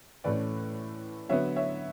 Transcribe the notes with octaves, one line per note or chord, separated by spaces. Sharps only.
A2 E3 A3 C#4 B4 D5
D3 F#3 B3 C#5 E5
C#5 E5